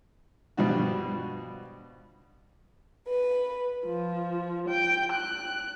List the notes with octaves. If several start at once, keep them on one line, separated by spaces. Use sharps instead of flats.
G2 B2 F3 G3 D4 F#4
B4
F3
G5
F#6